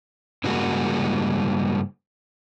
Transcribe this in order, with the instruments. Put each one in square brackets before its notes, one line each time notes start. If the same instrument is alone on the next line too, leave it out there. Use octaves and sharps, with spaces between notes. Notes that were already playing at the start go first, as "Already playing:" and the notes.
[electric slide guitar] G2 C#3 G3 G#3 A#3 F#4